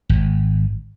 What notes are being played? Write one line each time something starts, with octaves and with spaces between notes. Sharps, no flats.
G#1